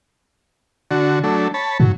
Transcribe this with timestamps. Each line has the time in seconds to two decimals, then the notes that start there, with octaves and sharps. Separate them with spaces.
0.91 D3 F#4
1.24 F#3 A3 D4
1.54 C#5 A5 B5
1.80 G#2 F#3